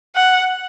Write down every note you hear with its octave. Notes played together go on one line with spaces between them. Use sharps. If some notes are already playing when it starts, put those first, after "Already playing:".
F#5